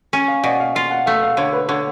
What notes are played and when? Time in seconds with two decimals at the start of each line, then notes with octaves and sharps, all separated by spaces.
0.13 C#4
0.28 F5
0.44 B2 D5
0.60 F5
0.75 F4 F5
0.91 F#5
1.06 A3 F5
1.23 F5
1.37 D3 C#5
1.53 B4
1.68 D3 C#5